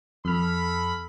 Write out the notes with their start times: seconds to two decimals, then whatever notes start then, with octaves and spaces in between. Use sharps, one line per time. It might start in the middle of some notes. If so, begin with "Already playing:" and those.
0.25 F2 A4 B5 F6